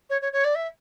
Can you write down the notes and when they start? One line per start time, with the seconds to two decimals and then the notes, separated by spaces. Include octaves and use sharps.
0.09 C#5
0.21 C#5
0.32 C#5
0.44 D5
0.55 E5